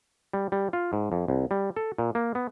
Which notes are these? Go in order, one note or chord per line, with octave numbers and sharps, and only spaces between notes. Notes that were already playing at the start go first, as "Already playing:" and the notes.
G3
G3
F4
G#2
F2
C2
G3
A4
A#2
A#3
B3